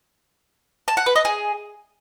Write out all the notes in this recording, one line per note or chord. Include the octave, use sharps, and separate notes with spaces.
A5
F#5
B4
D#5
G#4